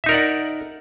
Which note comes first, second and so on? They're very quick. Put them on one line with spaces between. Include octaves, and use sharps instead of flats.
E5 D#4 A#4 D5 F#5